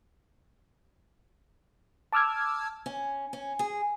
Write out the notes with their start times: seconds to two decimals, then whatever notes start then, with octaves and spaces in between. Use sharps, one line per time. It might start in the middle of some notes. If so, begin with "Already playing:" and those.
2.13 A5 D6 E6 F6 G#6
2.86 C#4
3.33 C#4
3.59 G#4